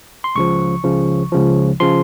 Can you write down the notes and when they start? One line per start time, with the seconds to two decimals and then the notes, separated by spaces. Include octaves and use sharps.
0.24 C6
0.35 C#2 C#3 F3 C#6
0.84 C#2 C#3 F3
1.32 C#2 C#3 F3
1.80 C#3 F3 C6